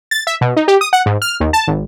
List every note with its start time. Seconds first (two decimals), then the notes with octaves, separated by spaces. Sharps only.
0.11 A6
0.27 E5
0.41 B2
0.56 D#4
0.68 G4
0.81 D#6
0.93 F#5
1.06 G#2
1.22 F6
1.40 D#2
1.53 A5
1.67 G#1